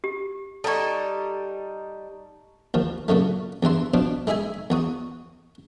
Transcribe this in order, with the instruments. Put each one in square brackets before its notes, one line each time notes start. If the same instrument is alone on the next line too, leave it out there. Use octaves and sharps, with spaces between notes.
[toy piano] G4
[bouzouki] G3 D#4 [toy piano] A4 D5 [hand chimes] A5 A#5 C#6
[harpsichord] D#2 F3
A#2 C#3 F#3 A3
E2 G2 E3 C6
B2 F3 D4
G#3 D#4 G#4 E5 G#5
E2 F#4 D#6